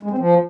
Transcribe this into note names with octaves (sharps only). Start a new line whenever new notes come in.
G#3
C4
F3